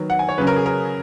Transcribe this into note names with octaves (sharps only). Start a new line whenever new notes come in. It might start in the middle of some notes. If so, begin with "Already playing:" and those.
Already playing: D#3 F#3 B3
F#5
G#5
C#5
C#3 F#3 C#4 B4
A#4
G#4
A#4